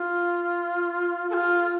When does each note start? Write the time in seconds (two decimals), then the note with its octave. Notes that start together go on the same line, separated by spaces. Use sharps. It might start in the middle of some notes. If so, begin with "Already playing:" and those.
Already playing: F4
1.30 A4
1.34 F4